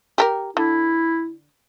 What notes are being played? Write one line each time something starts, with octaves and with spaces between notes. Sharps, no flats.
G4 A4 A#4
D3 E4